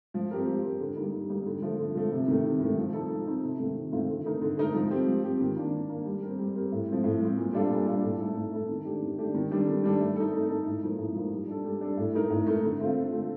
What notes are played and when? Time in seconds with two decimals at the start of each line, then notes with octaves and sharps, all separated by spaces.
0.14 F3
0.31 C4 G4 A#4
0.47 F3
0.63 C4 G4 A#4
0.80 D3
0.96 G3 A#3 D#4
1.13 D3
1.29 G3 A#3 D#4
1.45 D3
1.62 F3 A3
1.78 D3
1.95 F3 A3
2.12 C3
2.28 D#3 A3
2.45 C3
2.60 D#3 A3
2.77 F3
2.93 C4 D#4 A4
3.10 F3
3.26 C4 D#4 A4
3.43 C3
3.59 D#3 A3 C4 F4
3.76 C3
3.92 D#3 A3 C4 F4
4.09 D3
4.25 A3 D#4 A#4
4.41 D3
4.57 A3 D#4 A#4
4.74 F3
4.90 C4 G4
5.07 F3
5.24 C4 G4
5.40 D#3
5.56 A#3 D4
5.73 D#3
5.90 A#3 D4
6.05 G3
6.23 C4 G4 A#4
6.39 G3
6.55 C4 G4 A#4
6.72 A2
6.88 F3 C4
7.04 A2
7.21 F3 C4
7.38 A#2
7.53 G3 D4 F4 A4
7.71 A#2
7.86 G3 D4 F4 A4
8.03 A2
8.20 A3 D#4 A4
8.36 A2
8.52 A3 D#4 A4
8.69 D#3
8.85 A3 D4 G4
9.02 D#3
9.18 A3 D4 G4
9.34 D#3
9.51 G3 D4 A4
9.67 D#3
9.84 G3 D4 A4
10.00 A3
10.16 D#4 A4
10.34 A3
10.49 D#4 A4
10.66 A2
10.83 F3 A#3 D#4
10.98 A2
11.15 F3 A#3 D#4
11.32 G3
11.48 D4 A4
11.64 G3
11.81 D4 A4
11.97 A2
12.14 A3 D#4 A#4
12.30 A2
12.47 A3 D#4 A#4
12.63 D3
12.80 A3 C4 F4
12.96 D3
13.12 A3 C4 F4